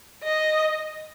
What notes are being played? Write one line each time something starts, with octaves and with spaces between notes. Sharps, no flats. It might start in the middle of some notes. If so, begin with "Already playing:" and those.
D#5